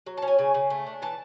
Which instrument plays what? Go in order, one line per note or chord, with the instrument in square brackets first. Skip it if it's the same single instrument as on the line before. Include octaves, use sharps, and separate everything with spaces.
[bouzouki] F#3
A5
C#4
G#5
C#3 G#5
C#3
A3
D4
E3 A5